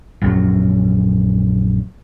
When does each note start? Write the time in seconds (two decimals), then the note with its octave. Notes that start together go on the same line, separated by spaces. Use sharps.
0.22 A#1 F#2 F#3